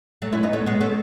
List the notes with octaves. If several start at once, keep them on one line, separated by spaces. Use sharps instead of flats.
F#3 A3
C#4 E4
B3 D#4
A3 C#4
G#3 B3
A3 C#4